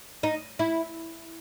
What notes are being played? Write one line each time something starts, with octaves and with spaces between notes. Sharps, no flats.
D#4
E4